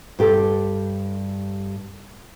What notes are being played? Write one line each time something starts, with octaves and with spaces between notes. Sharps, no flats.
G2 G4 A4